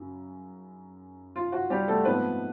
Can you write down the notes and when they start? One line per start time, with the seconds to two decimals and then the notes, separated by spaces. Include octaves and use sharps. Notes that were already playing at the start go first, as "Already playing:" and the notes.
Already playing: F#2 C#3
1.36 F4
1.52 F#4
1.70 G3 G4
1.88 A3 A4
2.05 G#2 F3 A3 B3 C4 B4